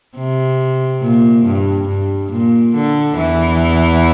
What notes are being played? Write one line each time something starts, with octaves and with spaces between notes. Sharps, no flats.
C3
A#2
G2
G2
A#2
D3
E2 E3